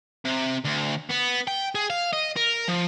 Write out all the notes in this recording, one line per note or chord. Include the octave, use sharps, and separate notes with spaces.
C3
D2
B3
G5
G#4
F5
D#5
A#4
F3